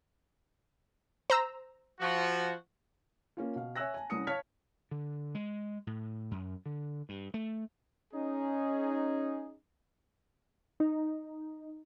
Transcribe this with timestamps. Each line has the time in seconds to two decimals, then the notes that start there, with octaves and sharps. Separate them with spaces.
1.30 C5 A#5 E6
1.99 F3 F#4
3.37 A#3 C#4 F4
3.56 B2 F5
3.76 C#5 E5 G#5 E6 F#6 A#6
3.94 G#5 A5
4.10 C2 C#4 D#6 C#7
4.27 C#5 F5 A5 F6 G#6 B6
4.91 D3
5.35 G#3
5.87 A2
6.31 F#2
6.66 D3
7.09 G2
7.34 A3
8.13 C#4 D#4 G#4
10.80 D#4